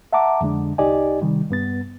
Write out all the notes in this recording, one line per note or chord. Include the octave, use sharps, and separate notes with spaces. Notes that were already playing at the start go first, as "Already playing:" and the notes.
E5 F#5 A5 A#5 D6
F2 D3 G#3 D4
C2 D#4 G4 D5 D#5 G#5
C3 D#3 G3
G2 B3 A6